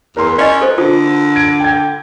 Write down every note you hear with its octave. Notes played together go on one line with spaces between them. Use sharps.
E2 A#4 C6
C#4 D5 D#5
A4 C5
D3 F4 A4
G#6 D7
G5 G#6